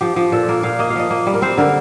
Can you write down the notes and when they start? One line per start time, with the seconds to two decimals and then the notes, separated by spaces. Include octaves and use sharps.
0.01 F3 G4
0.16 F3
0.32 A#2 A4
0.49 A#3 A#4
0.63 A#2 F5
0.79 A#3 D#5
0.90 F5
0.95 F3 D#5
1.11 A#3
1.27 G3
1.34 A#4
1.42 C4 C5
1.57 D3 A#4